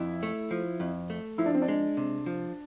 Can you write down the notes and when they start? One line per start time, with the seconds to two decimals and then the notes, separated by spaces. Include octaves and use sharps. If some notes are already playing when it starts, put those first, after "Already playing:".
Already playing: F2 E4
0.23 A3
0.51 F3
0.80 F2
1.10 A3
1.38 F3 E4
1.46 D4
1.55 C4
1.62 D4
1.68 G#3
1.97 C3
2.26 F3